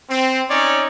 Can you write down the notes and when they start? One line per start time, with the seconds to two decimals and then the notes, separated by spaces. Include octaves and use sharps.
0.10 C4
0.50 C#4 D#4 C#5 D5